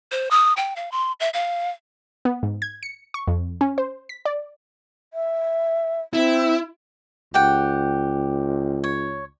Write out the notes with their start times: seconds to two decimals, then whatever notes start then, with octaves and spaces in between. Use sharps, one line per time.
0.12 C5
0.31 D#6
0.57 G5
0.76 F5
0.92 C6
1.20 E5
1.34 F5
2.25 B3
2.43 G#2
2.62 G#6
2.83 C#7
3.14 C#6
3.28 F2
3.61 C#4
3.78 C5
4.09 B6
4.25 D5
5.13 E5
6.14 C4 E4
7.34 C#2 G4 F#5 G5
8.84 C#5